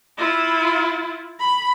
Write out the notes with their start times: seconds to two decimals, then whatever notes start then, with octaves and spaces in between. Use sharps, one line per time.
0.18 E4 F4
1.39 B5